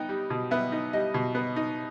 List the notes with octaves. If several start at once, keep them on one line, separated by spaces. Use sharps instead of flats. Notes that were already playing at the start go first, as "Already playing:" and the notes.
Already playing: B3 D#4 G5
G3
B2
B3 E5
D#4
G3 D#5
B2
B3
D#4